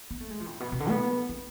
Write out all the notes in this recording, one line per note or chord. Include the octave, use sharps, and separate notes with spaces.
B3
A3
G#3
F3
A2
B2
C3
D3
B3
C4